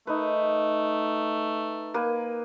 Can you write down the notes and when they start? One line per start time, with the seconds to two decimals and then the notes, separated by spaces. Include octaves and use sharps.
0.07 A3 D#4 B4
1.94 A#3 B4 G#5